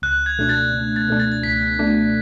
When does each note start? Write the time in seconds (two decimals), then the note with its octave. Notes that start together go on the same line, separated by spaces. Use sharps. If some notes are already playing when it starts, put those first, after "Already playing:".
0.02 C#2 F#6
0.26 G#6
0.38 B2 A3 D4
0.49 A6
0.72 C#2
0.96 A6
1.08 B2 A3 D4
1.20 A6
1.32 A6
1.43 C#2 B6
1.79 B2 A3 D4